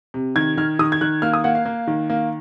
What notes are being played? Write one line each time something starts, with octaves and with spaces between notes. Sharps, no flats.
C3
D#3 G#6
D#3 F6
D#3 D#6
G#6
D#3 F#6
A#3 F6
D#6
A#3 F#5
F5
A#3
D#3
A#3